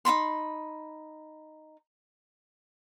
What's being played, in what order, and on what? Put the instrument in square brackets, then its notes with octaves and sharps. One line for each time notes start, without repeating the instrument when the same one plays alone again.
[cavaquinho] D#4 F4 B5 C6